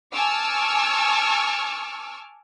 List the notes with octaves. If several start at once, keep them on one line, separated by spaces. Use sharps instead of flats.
G#5 A5 C#6 D6 E6 F6